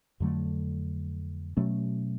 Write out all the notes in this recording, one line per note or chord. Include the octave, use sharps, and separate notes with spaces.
F2 D3 F#3 A3
B2 F#3 A3 C#4